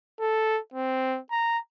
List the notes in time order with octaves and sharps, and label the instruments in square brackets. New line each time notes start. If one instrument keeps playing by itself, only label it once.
[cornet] A4
C4
A#5